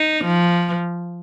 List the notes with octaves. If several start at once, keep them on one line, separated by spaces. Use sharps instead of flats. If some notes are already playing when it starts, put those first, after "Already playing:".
Already playing: D#4
F3